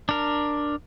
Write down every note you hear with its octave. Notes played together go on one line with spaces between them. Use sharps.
D4 A#4